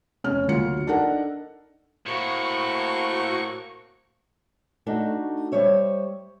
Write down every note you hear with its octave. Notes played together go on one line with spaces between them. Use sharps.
F1 C#4 F6
D2 F#3 A#3 F4 C#7
D4 D#4 A4 A#4 F#5
A2 A#3 C4 F#4 C#6
A3 D4 D#4 F#4
G3 C5 C#5 E5